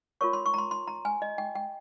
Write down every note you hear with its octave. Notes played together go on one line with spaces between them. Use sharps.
F4 A#4 C#5 C#6
C6
C#6
A#5
C6
C6
A#5
G#5
D#5
G5
G5